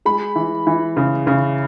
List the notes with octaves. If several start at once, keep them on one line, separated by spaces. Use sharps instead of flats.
G#3 B5
E3
E3
C#3
C#3